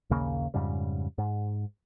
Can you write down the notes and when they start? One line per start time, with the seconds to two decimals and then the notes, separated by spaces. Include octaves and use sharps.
0.10 A#1 D#2 C#3 A#3
0.54 F2 G#2 C#3 G3
1.18 G#2